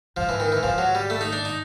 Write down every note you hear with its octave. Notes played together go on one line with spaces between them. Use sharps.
G#2 F3
E3
D#3
E3
G#2 F3
F#3
G3
A3
D#4
D4
D#4